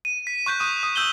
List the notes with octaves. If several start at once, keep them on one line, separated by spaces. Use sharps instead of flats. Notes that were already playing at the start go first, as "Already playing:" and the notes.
D#7
B6
C#6 F#6 G6 B6 D#7
C#6 D#6 D#7
D#6
D#6 E6 G6 F#7 G7